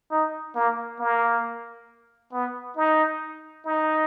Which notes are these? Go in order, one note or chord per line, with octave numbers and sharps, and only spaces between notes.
D#4
A#3
A#3
B3
D#4
D#4